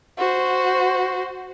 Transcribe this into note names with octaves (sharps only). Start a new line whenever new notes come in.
F#4 C5